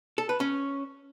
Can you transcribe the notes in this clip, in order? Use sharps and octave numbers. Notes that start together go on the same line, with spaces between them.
A4
B4
C#4